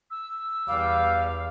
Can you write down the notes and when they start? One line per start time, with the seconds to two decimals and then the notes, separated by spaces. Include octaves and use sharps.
0.11 E6
0.68 E2 G3 F5